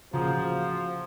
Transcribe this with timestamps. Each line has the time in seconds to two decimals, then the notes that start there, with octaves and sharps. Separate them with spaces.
0.13 A1 C#3 F3 A#3 F#4 G#4